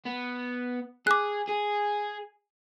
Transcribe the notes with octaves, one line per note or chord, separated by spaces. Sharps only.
B3
G#4 D6 F#6
G#4